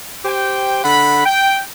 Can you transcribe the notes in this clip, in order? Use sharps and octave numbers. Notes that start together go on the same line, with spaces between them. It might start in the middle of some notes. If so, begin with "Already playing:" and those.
G4 C5 G5
D3 F#5 B5
G5